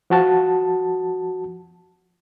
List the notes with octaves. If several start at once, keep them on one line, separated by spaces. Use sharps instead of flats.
F3 F#4 A5